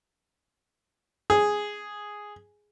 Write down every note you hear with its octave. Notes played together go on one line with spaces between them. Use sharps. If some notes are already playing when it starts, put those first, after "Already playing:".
G#4